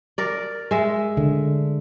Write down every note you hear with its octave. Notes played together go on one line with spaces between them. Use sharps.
A#4 D5
G#3 E5
D3